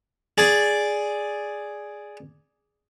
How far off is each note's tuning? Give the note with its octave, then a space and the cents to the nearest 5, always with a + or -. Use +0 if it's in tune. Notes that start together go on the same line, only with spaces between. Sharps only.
G#4 +0 D5 -5